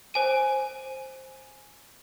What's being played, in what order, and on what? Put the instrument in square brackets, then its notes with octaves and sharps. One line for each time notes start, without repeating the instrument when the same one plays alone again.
[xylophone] C5 G#5 D#7